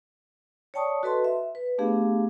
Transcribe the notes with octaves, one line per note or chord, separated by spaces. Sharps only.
C#5 D5 G5 A5 C#6 D#6
F#4 A4 B4 D#5 A5 C6
E5
B4
A3 B3 D4 G4 G#4 F5